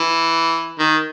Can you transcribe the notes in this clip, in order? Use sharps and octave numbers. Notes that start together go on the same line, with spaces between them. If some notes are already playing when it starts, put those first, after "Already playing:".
Already playing: E3
D#3